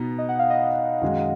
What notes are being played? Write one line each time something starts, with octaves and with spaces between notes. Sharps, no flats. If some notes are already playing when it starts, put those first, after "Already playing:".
Already playing: B2 B3 D#4
D#5
F#5
F5
D#5
F#2 D#3 G#3